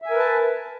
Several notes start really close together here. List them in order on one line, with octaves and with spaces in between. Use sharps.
E5 G#5 A#4 B4 A5